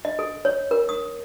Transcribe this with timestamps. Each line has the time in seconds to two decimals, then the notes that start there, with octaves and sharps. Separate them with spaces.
0.05 D#5
0.19 A4
0.45 C#5
0.71 A#4
0.89 D#6